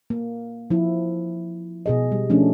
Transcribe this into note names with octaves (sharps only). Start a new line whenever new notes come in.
A#3
F3 E4
B2 G#4 D#5
G3
F3 A3 C#4 D4